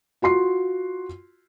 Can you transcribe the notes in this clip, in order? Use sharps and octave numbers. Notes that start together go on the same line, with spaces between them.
F4 F#4 C6 C7